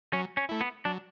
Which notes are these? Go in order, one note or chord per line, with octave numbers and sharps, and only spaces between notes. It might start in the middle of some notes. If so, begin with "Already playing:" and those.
F#3 C#4
C#4
A3 E4
B3
F#3 D4